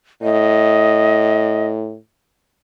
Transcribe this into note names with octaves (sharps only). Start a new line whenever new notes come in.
A2 D#5